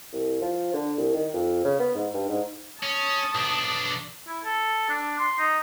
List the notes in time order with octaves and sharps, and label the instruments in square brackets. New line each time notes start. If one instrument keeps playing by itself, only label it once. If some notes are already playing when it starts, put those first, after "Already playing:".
[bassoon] C2
F3
D3
C2
D#3
F2
C#3
B3
G#2
G2
G#2
[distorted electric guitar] C#4 [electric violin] A5 D#6
[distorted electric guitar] B1 D4
[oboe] E4
A4
D4
C6
D#4